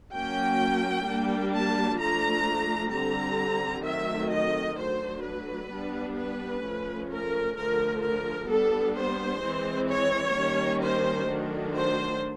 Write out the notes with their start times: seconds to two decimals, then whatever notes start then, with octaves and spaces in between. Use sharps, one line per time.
0.13 F#3 A#3 C#4 G5
1.06 G3 A#3 D4
1.53 A5
1.99 F3 A3 D4 A#5
2.92 D3 G3 C4 A#5
3.85 D#3 F#3 A3 C4 E5
4.31 D#5
4.77 F#3 A3 D4 C5
5.24 B4
5.71 G3 B3 D4
6.17 B4
6.64 F3 A3 C#4
7.10 A#4
7.56 D3 F3 A3 A#4
8.03 A#4
8.50 G3 B3 D4 A4
8.96 C5
9.42 E3 G#3 C4
9.89 C#5
10.35 D#3 G3 A#3 C#4
10.82 C5
11.29 D#3 F#3 A3 D4
11.75 C5